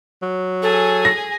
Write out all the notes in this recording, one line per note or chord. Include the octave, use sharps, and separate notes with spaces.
F#3
G#4 A4 G#5
A#6